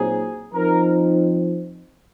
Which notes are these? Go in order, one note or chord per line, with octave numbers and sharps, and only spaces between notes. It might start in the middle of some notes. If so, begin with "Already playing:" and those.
Already playing: A#2 F#3 C4 D#4 G#4
F3 C4 D#4 A#4